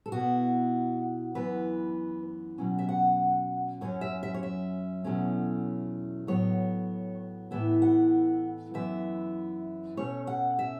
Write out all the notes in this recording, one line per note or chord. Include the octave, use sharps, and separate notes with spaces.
A4
B2 B3 E4 F#4
F#2 E3 B3 B4
B2 F#3 C#4
E5
F#5
F#2 F#3 C#4 C#5
E5
E5
C#5
E5
E2 B2 F#3 A3 C#4
A2 F#3 B3 C#5
A2 E3 B3 E4 E5
F#5
F#2 E3 B3 E4 E5
B2 A3 C#4 C#5
F#5
E5